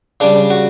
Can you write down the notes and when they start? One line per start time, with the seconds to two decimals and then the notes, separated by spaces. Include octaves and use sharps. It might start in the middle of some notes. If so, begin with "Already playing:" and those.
0.20 C#3 G3 D4
0.50 F#4